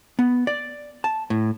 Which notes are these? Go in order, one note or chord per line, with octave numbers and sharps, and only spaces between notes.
B3
D5
A5
A2